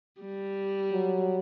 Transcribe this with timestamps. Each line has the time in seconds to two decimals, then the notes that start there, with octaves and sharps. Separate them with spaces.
0.20 G3
0.92 F#3